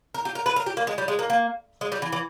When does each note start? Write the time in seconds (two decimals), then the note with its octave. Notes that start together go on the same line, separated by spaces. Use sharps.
0.14 A#4
0.25 G4
0.35 A#4
0.46 B4
0.56 A#4
0.66 G4
0.77 A#3
0.87 G#3
0.98 G3
1.08 G#3
1.19 A#3
1.30 A#3
1.81 G#3
1.92 G3
2.02 E3
2.12 E3